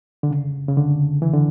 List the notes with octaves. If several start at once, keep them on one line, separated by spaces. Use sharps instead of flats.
D3
C#3
C#3
D3
E3
D3